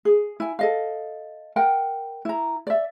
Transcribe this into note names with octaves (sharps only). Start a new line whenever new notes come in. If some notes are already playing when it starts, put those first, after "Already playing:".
G#4
E4 G#5
A4 D#5 F5
A#4 F#5 G5
E4 A#5
D5 E5